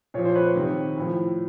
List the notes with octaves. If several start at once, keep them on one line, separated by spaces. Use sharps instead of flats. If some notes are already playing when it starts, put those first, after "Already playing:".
A#2 F3 C#5
C5
B4 C#5
C3 D#3
A2 F3